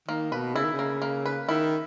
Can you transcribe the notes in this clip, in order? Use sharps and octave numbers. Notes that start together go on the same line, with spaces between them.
D#3 A#3
B2 B4
C#3 E4
D#3
C#3
A#3
A#3
B4
D#3 E4